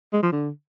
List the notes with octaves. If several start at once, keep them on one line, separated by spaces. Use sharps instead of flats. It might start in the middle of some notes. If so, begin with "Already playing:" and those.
G#3
F3
D3